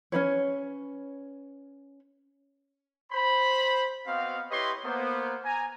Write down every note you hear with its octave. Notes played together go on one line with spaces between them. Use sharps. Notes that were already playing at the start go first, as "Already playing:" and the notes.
C#4 D4 B4 C#5
C5 B5
B3 C4 F#4 D#5 F5
E4 G4 B4 C#5 D#5 C6
A#3 B3 C5
G#5 A#5